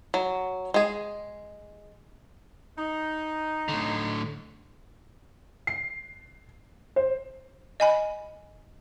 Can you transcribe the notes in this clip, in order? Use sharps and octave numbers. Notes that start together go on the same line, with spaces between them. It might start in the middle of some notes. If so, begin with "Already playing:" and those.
F#3
G#3 G#4
D#4
A2 D3
C7
C5
D#5 G#5 B5